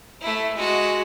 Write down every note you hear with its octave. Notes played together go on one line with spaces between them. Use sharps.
A3 E4
G#3 F#4